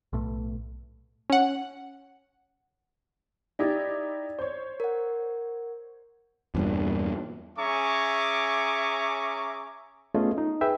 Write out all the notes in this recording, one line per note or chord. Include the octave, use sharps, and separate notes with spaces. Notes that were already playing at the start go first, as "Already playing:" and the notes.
B1 A2
C#4 F#5
D#4 E4 G4 D5 G#6 A6
C5 C#5
A#4 F#5
E2 G2 A#2
C#4 G#4 E5 A#5 C#6 D6
A3 B3 C#4 F4 G#4 D#5
D#4
G#4 B4 E5 G5